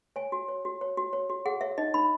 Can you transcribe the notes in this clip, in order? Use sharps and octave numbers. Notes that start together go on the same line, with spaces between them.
C#5 G#5
F#4
C#5
F#4
C#5
F#4
C#5
F#4
G#4 F#5
C#5 E5
D#4 D#5
D#4 B5